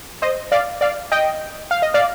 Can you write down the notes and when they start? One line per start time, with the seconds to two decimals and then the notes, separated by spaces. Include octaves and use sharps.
0.22 C5 D#5
0.52 D5 F5
0.81 D5 F5
1.12 D#5 G5
1.71 F5
1.82 D#5
1.94 D5 F5